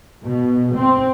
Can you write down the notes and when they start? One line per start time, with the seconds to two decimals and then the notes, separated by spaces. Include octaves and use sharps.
0.24 B2
0.76 C4